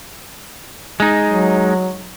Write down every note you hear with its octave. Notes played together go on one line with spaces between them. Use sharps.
G#3 D#4
F#3